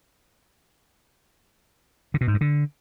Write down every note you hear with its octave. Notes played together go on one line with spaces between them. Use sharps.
D3
B2
G#2
G2
D3